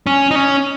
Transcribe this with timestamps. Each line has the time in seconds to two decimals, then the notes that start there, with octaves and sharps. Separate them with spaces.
0.07 C#4
0.31 D#4
0.35 C#4